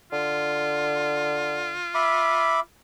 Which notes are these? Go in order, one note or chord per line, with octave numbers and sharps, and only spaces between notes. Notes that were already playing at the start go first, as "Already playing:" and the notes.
D3 F4
E5 B5 D6